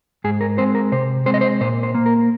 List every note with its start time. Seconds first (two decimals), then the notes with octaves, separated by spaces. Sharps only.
0.24 G#2 G#4
0.41 A#4
0.58 G#3 C4 C5
0.75 A#4
0.92 C3 C5
1.26 G#3 C4 C5
1.34 D#5
1.41 C5
1.61 A#2 C5
1.83 C5
1.95 A#3
2.06 A#4